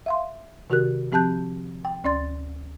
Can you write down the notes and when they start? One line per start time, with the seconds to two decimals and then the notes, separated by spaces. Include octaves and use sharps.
0.06 E5 F5 C6
0.70 C3 D#3 F#4 G4 A#4 F#6
1.12 F3 C4 G4 A5 F#6 G6
1.85 G5
2.04 D2 C#4 D5 C6 A6